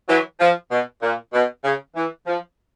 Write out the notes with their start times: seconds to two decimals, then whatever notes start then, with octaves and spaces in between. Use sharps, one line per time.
0.09 E3 F#3
0.40 F3
0.72 B2
1.03 A#2
1.34 B2
1.64 C#3
1.96 E3
2.27 F3